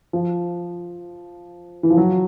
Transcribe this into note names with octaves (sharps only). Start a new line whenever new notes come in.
F3
E3
F3
F#3